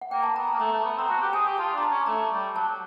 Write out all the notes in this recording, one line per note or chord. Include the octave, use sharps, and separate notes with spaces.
F#5
A#3 G5
A5
B3 A#5
A5
A#3
A3 A#5
A3
B3
C4 A#5
F#4 A5
G4
G#4 G#5
G4
F4 A5
D4 A#5
A5
C#4
A3 A#5
G3
F#3 A5